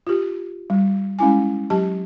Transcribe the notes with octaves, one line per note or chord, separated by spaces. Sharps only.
F4 G4
G3
G#3 C#4 E4 G#5
F#3 G4 A5